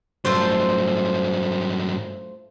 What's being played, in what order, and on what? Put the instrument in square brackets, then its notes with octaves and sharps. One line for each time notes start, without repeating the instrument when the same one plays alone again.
[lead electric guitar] G2 F#3 [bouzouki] A3 F4 C5